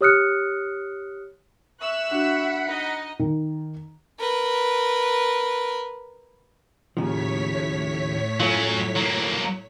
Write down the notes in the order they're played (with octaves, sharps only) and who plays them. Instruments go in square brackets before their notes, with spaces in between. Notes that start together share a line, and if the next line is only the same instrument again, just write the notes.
[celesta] G4 C#5 D#6 F6 F#6 C#7
[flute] E5 [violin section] C#6 E6 F#6
[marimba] D4 F#4 [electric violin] F#5 B5
[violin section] D#4 D#5
[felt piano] D#3
[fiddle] A#4 B4
[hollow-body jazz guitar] D#2 C#3 F3 [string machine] A2 C#5 B6
[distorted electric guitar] F#3 C#4 [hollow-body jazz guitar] A3 F4
[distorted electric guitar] F#3 A#3